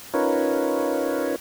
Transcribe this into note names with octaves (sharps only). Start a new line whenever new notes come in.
C#4 D#4 F4 A#4 B4 C#5